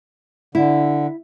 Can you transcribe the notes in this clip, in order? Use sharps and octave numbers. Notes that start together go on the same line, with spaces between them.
D3 E4